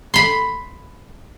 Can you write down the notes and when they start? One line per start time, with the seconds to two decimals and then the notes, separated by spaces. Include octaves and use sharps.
0.14 B5 C6